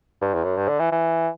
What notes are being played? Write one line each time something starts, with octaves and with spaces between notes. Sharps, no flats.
G2
E2
F#2
G2
D3
E3
E3